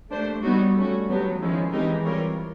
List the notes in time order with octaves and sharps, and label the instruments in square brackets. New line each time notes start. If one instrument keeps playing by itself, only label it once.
[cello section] A3 [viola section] A#3 D4 G4 C5
[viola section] F#3 B3 D#4 F#4 [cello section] G3
[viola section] A3 C#4 F#4
[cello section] F#3 [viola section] B3 D4 G4
[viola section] D#3 G#3 C#4 E4 [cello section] F3
[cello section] E3 [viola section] G#3 C4 D#4 G4 A#4
[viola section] G3 C4 F4 A#4 C#5